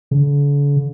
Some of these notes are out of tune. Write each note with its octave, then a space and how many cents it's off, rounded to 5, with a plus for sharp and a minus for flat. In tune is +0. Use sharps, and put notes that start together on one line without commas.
D3 -45